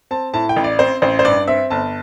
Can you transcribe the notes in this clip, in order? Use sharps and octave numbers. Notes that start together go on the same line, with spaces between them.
C4 A5
A2 A5
G5
A1
D5
C4 C5
A1 C5
C5
G2 D5
C4 E5
G1 A5